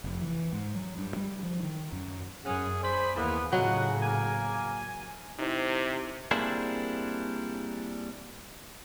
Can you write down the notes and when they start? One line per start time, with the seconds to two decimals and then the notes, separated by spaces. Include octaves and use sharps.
0.04 F1
0.21 E3
0.53 G#2
0.75 F#3
0.98 G2
1.16 G3
1.43 F3
1.63 D#3
1.92 F#2
2.46 F#2 C#4 G#4 F#5
2.83 C5 D5 G#5 B5
3.16 D#2 E3 A#3 B3 G#4
3.52 A2 C#3 F#3 F4 F#4 D#5 F#5
4.03 A#3 G#5
5.39 C3 D#4 E4 C5
6.31 G3 A#3 C4 D4 E4 G#4